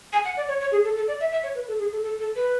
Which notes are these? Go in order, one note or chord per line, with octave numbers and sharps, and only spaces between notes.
G#5
F#5
D5
C#5
C#5
G#4
A4
A4
D5
E5
E5
C#5
B4
A4
G#4
A4
A4
A4
B4